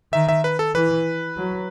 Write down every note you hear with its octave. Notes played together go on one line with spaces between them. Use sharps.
D#3 E5
E5
B4
A4
E3 B4
F#3